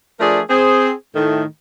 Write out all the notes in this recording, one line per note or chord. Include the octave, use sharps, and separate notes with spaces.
F3 A3 D4 G#4 A#4 D5
C4 G#4 C5
A2 D#3 A3